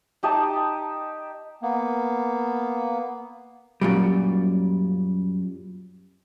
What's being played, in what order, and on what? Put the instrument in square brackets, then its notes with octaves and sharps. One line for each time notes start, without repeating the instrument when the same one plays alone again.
[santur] D#4 G4 D#5 A5
[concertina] A#3 B3
[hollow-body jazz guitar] F#2 A#2 G3